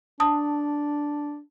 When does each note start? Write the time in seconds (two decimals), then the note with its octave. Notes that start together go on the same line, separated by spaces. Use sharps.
0.20 D4 A5 D#6